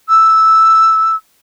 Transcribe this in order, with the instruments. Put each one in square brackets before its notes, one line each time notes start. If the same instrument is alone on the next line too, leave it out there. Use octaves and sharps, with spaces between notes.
[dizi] E6